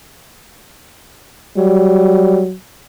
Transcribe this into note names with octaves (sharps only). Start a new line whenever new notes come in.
F#3 G3